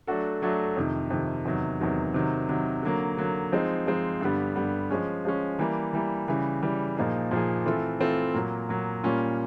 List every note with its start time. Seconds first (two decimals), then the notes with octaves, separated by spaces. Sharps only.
0.07 F#3 A3 D4 F#4 A4
0.42 F#3 A3 D4 F#4 A4
0.76 F2 C3 D#3
1.10 F2 C3 D#3
1.45 E2 C3 D#3 F#3
1.80 E2 C3 D#3 F#3
2.14 C3 D#3 F#3
2.49 C3 D#3 F#3
2.83 D3 F#3 A#3
3.17 D3 F#3 A#3
3.52 F3 G#3 C4 D#4
3.87 F3 G#3 C4 D#4
4.21 G2 D3 G3 B3
4.56 G2 D3 G3 B3
4.90 F3 G#3 C#4
5.25 F3 G#3 C#4
5.59 E3 G3 A#3
5.93 E3 G3 A#3
6.28 C#3 E3 G3
6.63 C#3 E3 G3
6.97 A#2 F3 A#3 D#4 G#4
7.31 A#2 F3 A#3 D#4 G#4
7.66 E3 A3 C4 F4 A4
8.00 E3 A3 C4 F4 A4
8.34 A#2 F#3 A#3
8.69 A#2 F#3 A#3
9.03 A#2 G3 A#3 C#4 F4